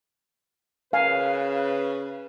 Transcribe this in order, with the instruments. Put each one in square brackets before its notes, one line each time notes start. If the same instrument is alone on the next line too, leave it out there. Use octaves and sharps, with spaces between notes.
[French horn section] C#3 B4 [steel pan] F5 G#5